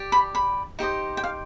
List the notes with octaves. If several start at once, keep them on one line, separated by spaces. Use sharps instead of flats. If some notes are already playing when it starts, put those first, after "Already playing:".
Already playing: G4 D5
B5
B5
D#4 G4 C5 D#5
G5
F5